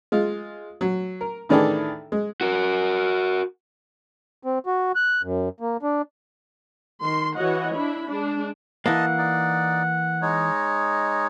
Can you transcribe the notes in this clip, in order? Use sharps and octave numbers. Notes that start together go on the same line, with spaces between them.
G#3 F4
F#3
A#4
A2 D#3 E3 D4 G#4 A4
G#3
F#4 A#4
C4
F#4
F#6
F#2
A#3
D4
D#3 C6
E3 F#4 C#5 D#5 F#5
D4 E4 B5
G#3 D4
E3 A#3 D#5 F#5 A5
D#4 D5
G#3 D#4 C#5